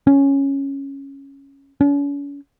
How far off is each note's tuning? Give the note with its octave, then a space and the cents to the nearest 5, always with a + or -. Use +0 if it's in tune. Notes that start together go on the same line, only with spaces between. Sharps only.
C#4 -5
C#4 +40